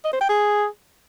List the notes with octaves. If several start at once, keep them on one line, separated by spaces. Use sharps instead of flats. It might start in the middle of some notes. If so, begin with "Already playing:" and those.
D#5
C5
G5
G#4